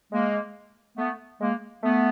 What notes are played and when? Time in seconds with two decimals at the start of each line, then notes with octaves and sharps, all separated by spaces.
0.12 G#3 A#3
0.97 A3 B3
1.40 G#3 A#3
1.83 A3 B3